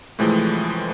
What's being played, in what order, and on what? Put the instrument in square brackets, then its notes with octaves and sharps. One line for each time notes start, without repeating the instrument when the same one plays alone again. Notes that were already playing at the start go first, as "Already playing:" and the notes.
[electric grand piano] A2 C3 E3 F3 G#3 A3